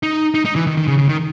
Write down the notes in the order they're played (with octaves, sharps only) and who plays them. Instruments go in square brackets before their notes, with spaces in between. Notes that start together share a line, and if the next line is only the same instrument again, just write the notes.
[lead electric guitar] D#4
D#4
D#4
E3
D#3
D#3
C#3
C#3
D#3